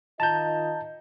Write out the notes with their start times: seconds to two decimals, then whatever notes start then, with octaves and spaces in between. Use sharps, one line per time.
0.20 D#3 F4 D#5 A5 A#5 G6